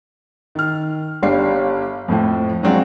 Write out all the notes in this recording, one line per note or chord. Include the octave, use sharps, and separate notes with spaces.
D#3 F6
G1 G3 D4 F5 C7
F2 A2 F3 C5
F#3 G#3 C4 D4 F4 F#4